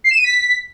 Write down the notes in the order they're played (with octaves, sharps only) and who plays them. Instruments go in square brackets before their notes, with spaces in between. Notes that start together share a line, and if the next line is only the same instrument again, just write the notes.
[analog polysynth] C7
E7
D#7
B6